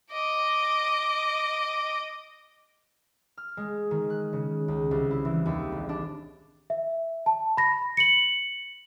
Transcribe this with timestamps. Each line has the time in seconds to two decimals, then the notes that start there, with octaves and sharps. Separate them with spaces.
0.13 D#5 D6
3.37 F6
3.57 G#3
3.91 D#3
4.10 F#6
4.33 C#3
4.68 C#2
4.91 C2
5.11 E4
5.25 E3
5.46 D#2
5.72 A1
5.89 D4
6.70 E5
7.26 A5
7.57 B5 A#6
7.97 C#7 F#7